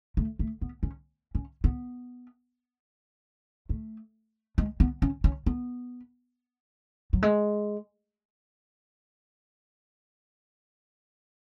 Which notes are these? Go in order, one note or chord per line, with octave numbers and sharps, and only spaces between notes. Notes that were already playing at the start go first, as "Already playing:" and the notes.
A3
A3
B3
C#4
C#4
B3
A3
G#3
B3
C#4
C#4
B3
F#3
G#3